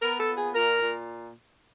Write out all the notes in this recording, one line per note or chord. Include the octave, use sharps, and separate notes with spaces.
B3 A#4
A4
A#2
G#4
A#2 A#4
A#2